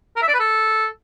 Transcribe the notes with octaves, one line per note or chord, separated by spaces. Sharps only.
A#4
E5
D5
B4
A4